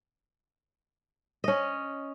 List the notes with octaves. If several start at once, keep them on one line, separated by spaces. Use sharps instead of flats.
C#4 D#5